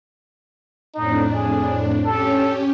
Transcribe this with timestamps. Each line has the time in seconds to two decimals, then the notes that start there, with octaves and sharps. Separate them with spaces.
0.94 F2 A2 D4 D#4
1.33 G#4
2.04 C#4 G4 A4